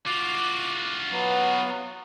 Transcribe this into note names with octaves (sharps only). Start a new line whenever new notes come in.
F4 F#4 D6
F#3 B3